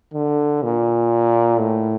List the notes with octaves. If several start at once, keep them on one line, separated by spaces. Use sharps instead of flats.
D3
A#2
A2